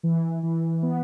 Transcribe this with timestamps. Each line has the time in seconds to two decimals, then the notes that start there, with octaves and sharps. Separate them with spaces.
0.03 E3
0.43 E3
0.83 B3